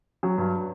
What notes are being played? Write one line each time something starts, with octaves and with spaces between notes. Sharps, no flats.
F#3
G2